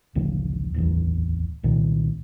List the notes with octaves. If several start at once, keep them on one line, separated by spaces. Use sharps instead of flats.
A1 D2 C#3 F3
D1 A1 E2
C2 A#2 D#3